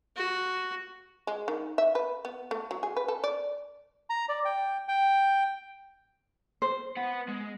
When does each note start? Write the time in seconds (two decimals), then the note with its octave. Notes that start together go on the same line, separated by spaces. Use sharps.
0.16 F#4
1.27 G#3
1.48 D#3
1.78 E5
1.95 B4
2.25 B3
2.51 A3
2.71 F#3
2.83 G#4
2.96 B4
3.08 A4
3.24 D5
4.10 A#5
4.29 D5
4.45 G5
4.88 G5
6.62 C5
6.97 B3 F#5
7.28 G#3